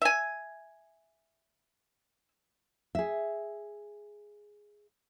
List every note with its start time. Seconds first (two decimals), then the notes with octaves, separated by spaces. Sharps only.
0.02 E5 G#5
2.95 G#4 E5